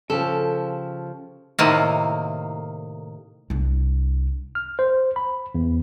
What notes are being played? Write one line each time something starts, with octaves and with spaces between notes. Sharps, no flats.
C#3 F3 G4 A4
A2 C3 D#3 A#3
C2 D4
F6
C5
B5
E2